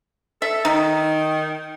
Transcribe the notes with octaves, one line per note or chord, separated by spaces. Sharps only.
A4 E5
D#3 D#4